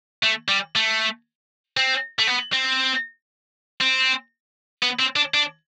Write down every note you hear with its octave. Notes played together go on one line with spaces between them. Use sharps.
A3
G3
A3
C4
A3
B3
C4
C4
B3
C4
D4
D4